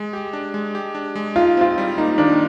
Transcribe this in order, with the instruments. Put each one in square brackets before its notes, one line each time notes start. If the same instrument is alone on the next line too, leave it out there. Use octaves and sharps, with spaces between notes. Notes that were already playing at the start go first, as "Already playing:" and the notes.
Already playing: [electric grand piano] G#3
G4
D4
G#3
G4
D4
G#3
[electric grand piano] D#4 [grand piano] F4
[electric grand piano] C4 [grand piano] F4
[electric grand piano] G3
[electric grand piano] A#3 [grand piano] D#4
[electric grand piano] D#3 [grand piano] D4